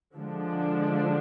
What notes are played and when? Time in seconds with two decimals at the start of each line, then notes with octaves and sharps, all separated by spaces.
0.15 D3 F3 G#3 D4